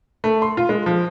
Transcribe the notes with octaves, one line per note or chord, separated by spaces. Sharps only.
A3
C6
F4
G#3
F3